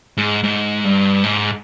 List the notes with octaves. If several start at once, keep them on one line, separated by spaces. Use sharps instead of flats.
G#2
G#2
G2
G#2